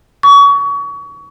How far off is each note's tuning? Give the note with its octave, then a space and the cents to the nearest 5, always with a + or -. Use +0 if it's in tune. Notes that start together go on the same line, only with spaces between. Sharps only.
C#6 +30